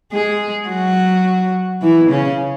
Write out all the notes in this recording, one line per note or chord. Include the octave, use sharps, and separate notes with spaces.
G#3 G#4
F#3 F#4
E3 E4
C#3 C#4